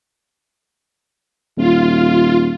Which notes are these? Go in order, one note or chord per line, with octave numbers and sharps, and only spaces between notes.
D#1 F4